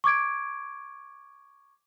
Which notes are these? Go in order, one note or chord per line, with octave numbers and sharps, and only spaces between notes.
C#6 D6 G#6 D7